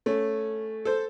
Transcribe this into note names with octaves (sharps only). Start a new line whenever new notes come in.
A3 C#4
A4 C5